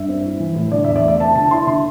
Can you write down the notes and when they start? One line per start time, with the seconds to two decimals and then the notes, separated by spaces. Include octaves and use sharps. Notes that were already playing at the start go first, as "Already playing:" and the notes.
Already playing: G2 E5
0.09 C4
0.24 E4
0.40 E3
0.56 A2
0.72 D3 D5
0.85 E2 E5
0.96 D5
1.04 A3 E5
1.20 C4 A5
1.35 D3 A5
1.51 E4 C6
1.67 D3 C6